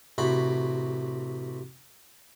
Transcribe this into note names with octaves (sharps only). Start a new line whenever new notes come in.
A1 C3 F#4 B5